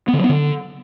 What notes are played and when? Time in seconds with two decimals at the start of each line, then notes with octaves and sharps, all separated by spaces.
0.08 B3
0.13 D3
0.19 F#3
0.24 B3
0.29 D3